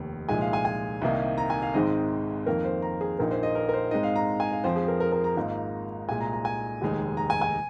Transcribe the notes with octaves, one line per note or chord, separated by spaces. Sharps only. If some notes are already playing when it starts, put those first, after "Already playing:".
Already playing: F1 D#2 D#3
C2 A#2 F3 G#3 D#4 G#5
F5
G#5
G#5
C2 C3 D#3 A#3 D#4
A#5
G#5
F5
G#1 G#2 D#3 G#3 C4 D#5
F2 D#3 A#3 A#4
C5
A#5
G#4
A#1 A#2 A#3 D#4 A#4
C5
D#5
A#4
A#4
C5
G#2 G#3 C4 D#4 D#5
F5
A#5
G#5
F5
F2 F3 C4 C5
G#4
A#4
A#4
A#4
A#5
G#1 G#2 F3 A#3 D#4
C2 A#2 G#3 G#5
A#5
A#5
G#5
F1 D#2 D#3 G#3 D#4
A#5
G#5
G#5